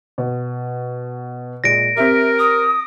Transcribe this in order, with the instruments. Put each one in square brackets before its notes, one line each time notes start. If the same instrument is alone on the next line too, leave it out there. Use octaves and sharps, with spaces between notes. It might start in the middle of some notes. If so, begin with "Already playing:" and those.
[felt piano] B2
[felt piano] A#2 G#3 [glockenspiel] A#6 D7
[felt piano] C4 G4 [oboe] A#4 [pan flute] E5
[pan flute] D#6